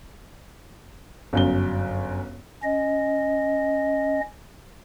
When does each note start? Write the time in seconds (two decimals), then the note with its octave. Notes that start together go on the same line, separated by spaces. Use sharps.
1.33 G1 F#2 G7
2.63 C#4 D#5